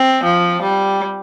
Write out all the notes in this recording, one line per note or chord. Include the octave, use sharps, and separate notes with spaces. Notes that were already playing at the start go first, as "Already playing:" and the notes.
Already playing: C4
F3
G3